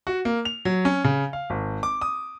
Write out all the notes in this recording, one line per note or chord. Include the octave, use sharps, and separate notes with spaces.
F#4
A#3
F7
F#3
C#4
C#3
F5
G#1
D6
D#6